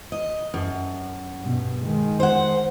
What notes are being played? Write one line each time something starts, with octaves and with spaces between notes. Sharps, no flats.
D#5
F#2
G2 B2
D#3 G#3
C5 F#5